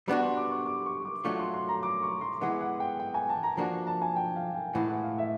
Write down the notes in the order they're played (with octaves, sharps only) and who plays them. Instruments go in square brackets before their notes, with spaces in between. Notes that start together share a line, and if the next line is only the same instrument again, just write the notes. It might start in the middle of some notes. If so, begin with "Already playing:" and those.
[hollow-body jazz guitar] G3 B3 D4 F#4 [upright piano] B5
[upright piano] C6
D6
C#6
D6
C#6
D6
[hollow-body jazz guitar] F#3 A3 D4 F4 [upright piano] C#6
[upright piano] C6
C6
A#5
D6
C#6
C6
[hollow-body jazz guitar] E3 G#3 B3 [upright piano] F#5
[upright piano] F#5
G5
G5
G#5
A5
A#5
[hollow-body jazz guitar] F3 A#3 D4 F#4 [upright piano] A5
[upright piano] A5
G#5
G5
F5
G5
[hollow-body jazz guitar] A2 E3 G#3 [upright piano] F#5
[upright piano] F#5
F5
E5